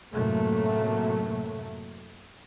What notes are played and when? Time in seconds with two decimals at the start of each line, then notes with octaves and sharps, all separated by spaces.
0.12 F#2 A2 C3 F#3 A3 A#3